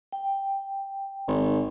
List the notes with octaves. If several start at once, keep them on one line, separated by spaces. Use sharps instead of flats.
G5
G#1